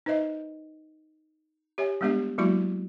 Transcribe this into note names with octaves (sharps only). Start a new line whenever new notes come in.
D#4 B4 C5 D#5 E5
G4 C#5 E5 G#5
G3 G#3 B3 D4 G4 E5
F#3 G#3 A#3 E4 F#4 C#6